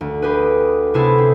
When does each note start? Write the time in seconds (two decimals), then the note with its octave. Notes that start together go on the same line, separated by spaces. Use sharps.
0.01 D2
0.22 G4 G#4 B4
0.94 C3 B3 E4 G#4 A4
1.18 C4